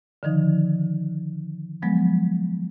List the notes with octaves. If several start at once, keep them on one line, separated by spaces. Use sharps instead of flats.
D3 D#3 F3 D#4
F3 F#3 G#3 B3